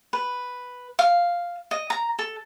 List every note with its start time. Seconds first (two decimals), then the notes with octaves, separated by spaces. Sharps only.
0.13 B4
0.99 F5
1.71 D#5
1.90 A#5
2.19 A4